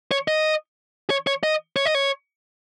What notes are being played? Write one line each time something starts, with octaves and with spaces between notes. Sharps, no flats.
C#5
D#5
C#5
C#5
D#5
C#5
D#5
C#5